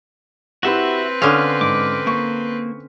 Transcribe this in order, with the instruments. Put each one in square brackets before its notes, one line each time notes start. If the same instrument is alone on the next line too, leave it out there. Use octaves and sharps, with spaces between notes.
[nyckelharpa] C4 B4 [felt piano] E4 G4 F#5 [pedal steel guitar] F#4 E5
[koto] D3 C#4 [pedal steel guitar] F5 [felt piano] D#6 F6
[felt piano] G#2 [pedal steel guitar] D6
[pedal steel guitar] A#3 [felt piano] C#6